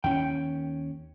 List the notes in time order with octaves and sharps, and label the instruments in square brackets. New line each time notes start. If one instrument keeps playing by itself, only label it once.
[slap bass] D#2 C#4 [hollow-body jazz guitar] G5